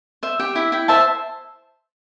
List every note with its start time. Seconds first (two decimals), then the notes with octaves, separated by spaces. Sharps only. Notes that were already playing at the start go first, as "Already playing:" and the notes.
0.23 C5 E5
0.40 G4 G5
0.56 E4 E5
0.72 E4 G5
0.88 C5 E5 A5